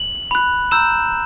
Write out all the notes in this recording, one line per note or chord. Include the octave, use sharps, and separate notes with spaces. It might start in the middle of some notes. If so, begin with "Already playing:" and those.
Already playing: F#7
B5 F#6
A#5 E6 G6 E7